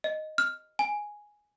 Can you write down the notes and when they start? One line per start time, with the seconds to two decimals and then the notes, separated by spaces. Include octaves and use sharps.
0.04 D#5
0.38 F6
0.79 G#5